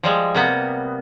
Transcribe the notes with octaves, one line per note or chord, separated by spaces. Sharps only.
F3 G3 G#3
C3 A#3 B3